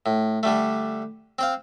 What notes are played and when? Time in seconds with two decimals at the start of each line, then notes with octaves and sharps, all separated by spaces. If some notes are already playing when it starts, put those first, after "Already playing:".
0.06 A2
0.43 D3 G3 A3
1.39 C4 C5 F5